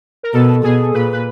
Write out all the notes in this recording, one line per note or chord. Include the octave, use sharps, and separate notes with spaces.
A#4
B2 A4
B2 G#4
A#2 B4
B4